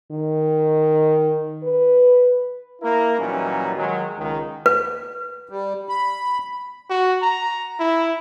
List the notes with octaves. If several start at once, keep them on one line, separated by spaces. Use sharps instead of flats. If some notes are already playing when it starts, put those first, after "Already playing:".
D#3
B4
A#3 E4 A#4
A#2 E3 F#3 G3 C#4 D#4
D#3 F#3 G#3
C#2 D#3
B4
G3
B5
F#4
A#5
E4